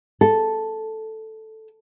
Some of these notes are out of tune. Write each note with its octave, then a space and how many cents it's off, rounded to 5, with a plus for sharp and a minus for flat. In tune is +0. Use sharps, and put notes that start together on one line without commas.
A4 +0